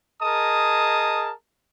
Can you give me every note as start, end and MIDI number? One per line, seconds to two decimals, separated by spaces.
0.22 1.31 68
0.22 1.31 70
0.22 1.31 75
0.22 1.31 81
0.22 1.31 87